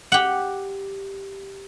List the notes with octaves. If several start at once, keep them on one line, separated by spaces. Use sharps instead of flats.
G4 F#5